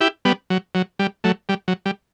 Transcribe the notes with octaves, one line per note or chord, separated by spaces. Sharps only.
E4 G4
G3 B3
F#3
F#3
G3
F#3 A3
G3
F#3
G3